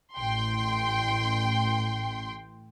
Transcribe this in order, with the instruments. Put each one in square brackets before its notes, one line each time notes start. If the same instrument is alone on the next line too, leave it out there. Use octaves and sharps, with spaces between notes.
[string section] A1 G5 C6